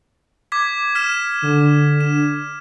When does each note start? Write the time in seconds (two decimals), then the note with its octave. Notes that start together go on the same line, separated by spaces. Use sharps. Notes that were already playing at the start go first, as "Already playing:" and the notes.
0.52 D6 G#6 B6
0.95 F6 B6 E7
1.42 D3
2.01 E7